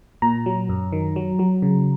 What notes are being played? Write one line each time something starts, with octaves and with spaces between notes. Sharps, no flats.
A#2 A#5
F#3
F#2
D#3
F#3
F#3
C#3